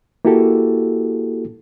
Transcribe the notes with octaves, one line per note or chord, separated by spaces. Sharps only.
A#3 E4 F#4 G4 A4